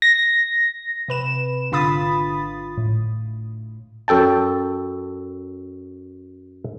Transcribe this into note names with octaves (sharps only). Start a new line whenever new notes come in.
A#6
C3 B4 E7
G#1 D3 F4 B5 D#6 A6
A2
F#2 A4 G5 A5